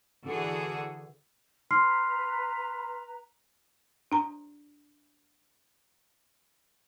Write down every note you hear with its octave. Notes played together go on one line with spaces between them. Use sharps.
D3 E3 F#4 G#4 A4
B4 A#5 C6 F6 C7
D4 A#5